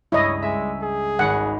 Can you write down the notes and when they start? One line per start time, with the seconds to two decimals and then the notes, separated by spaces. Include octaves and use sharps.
0.12 C#2 G2 E4 C#5 D#5
0.42 G#3 E5 G#5
0.82 G#4
1.19 G#1 C#2 F#5